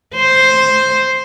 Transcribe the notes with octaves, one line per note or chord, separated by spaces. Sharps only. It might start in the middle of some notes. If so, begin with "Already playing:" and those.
C5